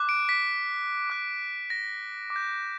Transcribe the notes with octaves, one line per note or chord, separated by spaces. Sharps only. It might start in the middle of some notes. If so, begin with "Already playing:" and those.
Already playing: D6 F#6
D7
B6
D6 F#6
A#6
D6
G6